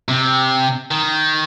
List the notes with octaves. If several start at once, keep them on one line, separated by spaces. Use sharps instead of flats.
C3
D#3